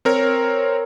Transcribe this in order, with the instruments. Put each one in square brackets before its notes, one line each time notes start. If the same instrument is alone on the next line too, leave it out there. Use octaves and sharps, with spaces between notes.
[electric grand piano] C4 A#4 C#5